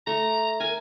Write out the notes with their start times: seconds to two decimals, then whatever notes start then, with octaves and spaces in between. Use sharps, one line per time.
0.07 A3 A#5
0.60 A#4 G#5